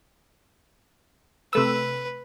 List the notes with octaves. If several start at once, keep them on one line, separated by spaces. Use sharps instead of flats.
C3 A3 B4 E6